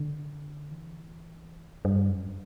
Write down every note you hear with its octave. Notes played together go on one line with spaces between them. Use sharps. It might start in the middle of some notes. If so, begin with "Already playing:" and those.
Already playing: D3
E3
G2
F#2